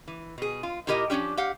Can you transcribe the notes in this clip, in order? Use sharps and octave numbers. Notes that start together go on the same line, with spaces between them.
E3
B2 G#4
F4
A#2 E4 G4 A#4 D#5 A#5
F3 A3 C#4 D4 G4
G4 F5 F#5